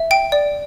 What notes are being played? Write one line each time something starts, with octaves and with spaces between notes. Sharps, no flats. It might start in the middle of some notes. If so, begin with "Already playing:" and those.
Already playing: E5
G5 D7
D5